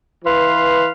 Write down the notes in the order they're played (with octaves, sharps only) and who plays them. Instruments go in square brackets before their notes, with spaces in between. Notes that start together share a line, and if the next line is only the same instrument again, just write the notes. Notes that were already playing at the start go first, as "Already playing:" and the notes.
[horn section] E3 B4 F5 C6